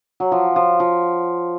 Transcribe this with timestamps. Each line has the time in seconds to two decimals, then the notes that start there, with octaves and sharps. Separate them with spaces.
0.20 F#3
0.32 F3
0.56 F3
0.80 F3